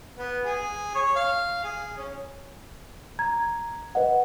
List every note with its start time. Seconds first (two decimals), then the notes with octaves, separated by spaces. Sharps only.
0.18 B3
0.45 G#4
0.95 C#5
1.16 F5
1.64 G#4
1.97 C#4
3.19 A#5 G#6
3.95 B4 D#5 F#5